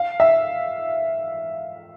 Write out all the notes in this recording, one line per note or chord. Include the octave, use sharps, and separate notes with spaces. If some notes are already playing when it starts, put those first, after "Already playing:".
Already playing: F5
E5